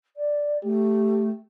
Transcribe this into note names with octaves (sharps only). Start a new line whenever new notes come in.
D5
A3 G4